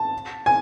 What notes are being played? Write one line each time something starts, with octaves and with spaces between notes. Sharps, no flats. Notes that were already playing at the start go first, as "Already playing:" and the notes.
Already playing: A5
G#5